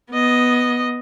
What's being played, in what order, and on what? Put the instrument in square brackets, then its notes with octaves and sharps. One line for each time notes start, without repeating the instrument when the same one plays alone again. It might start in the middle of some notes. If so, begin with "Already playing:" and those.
[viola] B3 D#5